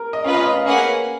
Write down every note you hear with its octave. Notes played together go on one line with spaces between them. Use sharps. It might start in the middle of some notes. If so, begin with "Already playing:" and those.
Already playing: A#4
D#5
C#4 F4 B4 F5
D#5
D#5
F5
A#3 C#4 G#4 B4 F5 F#5